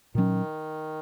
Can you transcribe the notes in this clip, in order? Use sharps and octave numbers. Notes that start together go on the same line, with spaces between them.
A#2 D#3 F#3 C#4